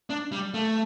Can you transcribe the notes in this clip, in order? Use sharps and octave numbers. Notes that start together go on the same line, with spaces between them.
D4
G3
A3